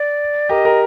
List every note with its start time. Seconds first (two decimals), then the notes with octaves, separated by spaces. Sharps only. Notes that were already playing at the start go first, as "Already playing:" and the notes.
Already playing: D5
0.49 G4 A#4 D#5
0.65 G4 A#4